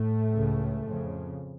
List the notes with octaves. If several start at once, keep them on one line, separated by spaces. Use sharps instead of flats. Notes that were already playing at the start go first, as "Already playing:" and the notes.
Already playing: A2 A3
C#2 C#3
F2 C#3